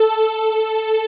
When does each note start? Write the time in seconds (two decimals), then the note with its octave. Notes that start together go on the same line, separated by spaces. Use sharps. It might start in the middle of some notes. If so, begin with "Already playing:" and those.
Already playing: A4
0.39 A4